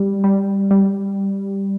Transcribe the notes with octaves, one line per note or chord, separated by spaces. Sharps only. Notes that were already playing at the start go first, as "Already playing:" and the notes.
Already playing: G3
G3
G3